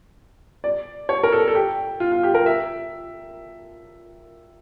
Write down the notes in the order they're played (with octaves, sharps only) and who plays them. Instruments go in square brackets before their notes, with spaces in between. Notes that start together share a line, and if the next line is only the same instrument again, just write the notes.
[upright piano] D5
C#5
A#4
A4
A4
G4
F4
F4
G4
A#4
E5